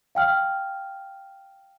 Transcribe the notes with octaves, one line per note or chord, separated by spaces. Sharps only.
F5 G5 F6